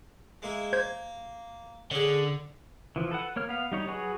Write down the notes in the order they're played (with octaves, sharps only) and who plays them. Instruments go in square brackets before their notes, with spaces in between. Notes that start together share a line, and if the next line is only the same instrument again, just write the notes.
[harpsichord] G#3 A#3 E4
[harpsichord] A#3 [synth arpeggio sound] C5 G6 G#6
[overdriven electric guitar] D3 [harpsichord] C#4 G#4
[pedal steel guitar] E3 F3
A4 B4 F#5
A#3 C#5 F6
B3 F5
G3 D#4 C#5
F#3 F#4 G#4 B4 C#5